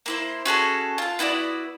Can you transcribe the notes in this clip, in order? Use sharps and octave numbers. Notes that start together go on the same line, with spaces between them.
A#3 E4 C5
C#4 F#4 G#4 A4
F4 A5
B3 E4 F#4 D5